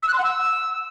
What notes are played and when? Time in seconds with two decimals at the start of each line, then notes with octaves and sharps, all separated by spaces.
0.03 E6
0.08 F#6
0.13 C6
0.19 F#5
0.24 E6